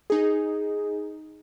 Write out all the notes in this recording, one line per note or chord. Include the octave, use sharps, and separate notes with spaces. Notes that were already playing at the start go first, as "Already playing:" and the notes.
D#4 G#4